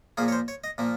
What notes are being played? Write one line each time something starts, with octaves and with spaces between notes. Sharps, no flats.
A#2 F3 A#3 G#4
C#5
C5
C#5
D#5
A#2 F3 A#3